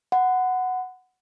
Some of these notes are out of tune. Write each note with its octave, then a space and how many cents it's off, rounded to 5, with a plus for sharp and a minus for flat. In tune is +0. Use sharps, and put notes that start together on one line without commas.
F#5 +0 B5 +45